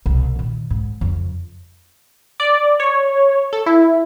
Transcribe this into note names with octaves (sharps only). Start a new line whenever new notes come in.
C2 B2
A#2 D#3
G#2
F2 C#3
D5
C#5
A4
E4